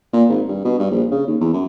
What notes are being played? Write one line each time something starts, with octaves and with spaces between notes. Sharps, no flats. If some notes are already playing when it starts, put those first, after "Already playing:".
A#2
G#1
G2
B2
G2
A#1
C#3
D#2
E2
F#2